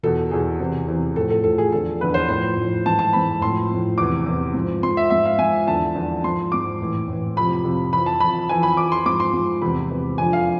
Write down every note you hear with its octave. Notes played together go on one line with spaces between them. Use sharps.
E2 B2 A4
E2 B2 G#4
E2 C3 E3
E2 C3 E3
A2 F3 A4
A4
A2 F3 A4
G#4
E2 D3 F3 A4
E2 D3 F3 B4
C5
A2 F3 C5
A2 F3
G#2 E3 A5
A5
G#2 E3 B5
A2 F3 C6
A2 F3
E2 C3 E3 D6
E2 C3 E3
G#2 F3
G#2 F3 C6
E5
G#2 F3 E5
F5
G#2 F3 G#5
E2 D3 F3 A5
E2 D3 F3
G#2 F3 C6
G#2 F3 D6
A2 E3
A2
E3
F2 C3 F3 B5
F2 C3 F3
F2 E3 B5
A5
F2 E3 B5
F2 E3 G#5
B5
F2 E3 D6
C6
G#2 F3 D6
C6
G#2 F3
E2 C3 E3 B5
E2 C3 E3
F2 D3 F3 G#5
F5